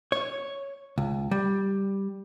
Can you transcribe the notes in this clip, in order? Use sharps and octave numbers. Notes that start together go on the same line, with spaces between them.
C#5
C#2
G3